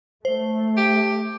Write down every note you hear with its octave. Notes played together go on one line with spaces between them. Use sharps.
A3 C5
G4